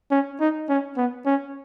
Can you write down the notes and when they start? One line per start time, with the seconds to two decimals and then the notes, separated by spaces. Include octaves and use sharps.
0.11 C#4
0.40 D#4
0.69 C#4
0.97 B3
1.26 C#4